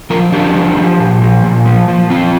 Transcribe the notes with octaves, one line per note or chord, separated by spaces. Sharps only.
F3 F4 A#4
F3 D4 G4
F3
F3
A#2
F3
A#2
F3
F3
F3 C4 F4